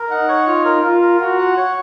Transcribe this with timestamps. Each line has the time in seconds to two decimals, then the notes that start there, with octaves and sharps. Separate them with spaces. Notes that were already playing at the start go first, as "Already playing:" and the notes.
Already playing: A#4
0.09 D#4 F#5
0.28 C#5
0.47 F4
0.65 A#4
0.83 F4 A#4
1.01 A#4
1.20 F4 F#4
1.38 F#5
1.57 C#5